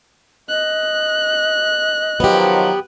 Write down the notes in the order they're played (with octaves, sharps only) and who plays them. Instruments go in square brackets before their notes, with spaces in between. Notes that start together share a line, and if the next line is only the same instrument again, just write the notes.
[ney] D#5 [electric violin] F#6
[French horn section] D#3 F3 F#3 [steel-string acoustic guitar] B3 G4